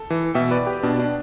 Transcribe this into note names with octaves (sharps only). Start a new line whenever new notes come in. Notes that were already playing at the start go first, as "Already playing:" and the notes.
Already playing: A4
E3
B2 E5 G5
B4 D5
G4 B4
B2 D4
D4